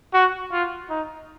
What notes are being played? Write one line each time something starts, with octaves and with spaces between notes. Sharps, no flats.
F#4
F4
D#4